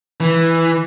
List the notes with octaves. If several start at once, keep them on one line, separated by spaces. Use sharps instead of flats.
E3